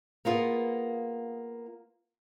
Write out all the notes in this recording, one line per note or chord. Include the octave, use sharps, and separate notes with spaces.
A#3 B3 F4 G#4